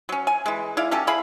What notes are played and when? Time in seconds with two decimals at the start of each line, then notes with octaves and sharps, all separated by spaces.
0.09 F#3 C#4
0.27 G#5
0.46 E3 G#3
0.77 E4 D5 F5
0.91 F#3 C#4 G4 A4
1.07 E4 G#4 F5 B5